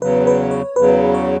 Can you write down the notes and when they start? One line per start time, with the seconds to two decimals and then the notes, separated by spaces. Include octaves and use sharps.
0.01 E2 C#3 F#3 B4
0.27 B4
0.51 C#5
0.76 E2 C#3 F#3 B4
1.14 C#5